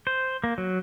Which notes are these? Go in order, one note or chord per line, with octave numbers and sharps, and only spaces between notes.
C5
A#3
F#3